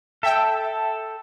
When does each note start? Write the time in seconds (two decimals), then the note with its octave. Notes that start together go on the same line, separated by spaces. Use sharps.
0.23 A4 E5 G5